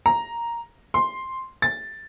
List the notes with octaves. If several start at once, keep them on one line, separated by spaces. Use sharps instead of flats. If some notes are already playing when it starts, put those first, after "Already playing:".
A#5
C6
A6